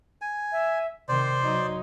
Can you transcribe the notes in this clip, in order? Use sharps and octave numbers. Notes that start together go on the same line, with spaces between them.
G#5
E5
C3 D#3 C5 D5 C6
F#3 D#4